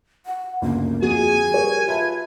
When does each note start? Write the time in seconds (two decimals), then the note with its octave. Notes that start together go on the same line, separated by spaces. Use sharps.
0.26 F#5
0.62 G1 D2 C#3 A#3
1.02 F2 F#4 G#4 G#5
1.52 G3 A#4 C#5
1.88 F4 B4 E5 A5